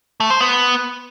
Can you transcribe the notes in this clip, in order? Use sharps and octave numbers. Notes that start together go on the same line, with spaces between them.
A3
C5
B3